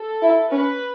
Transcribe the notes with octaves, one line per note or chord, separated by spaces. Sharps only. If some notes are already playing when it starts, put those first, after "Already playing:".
Already playing: A4
E4
C#4 B4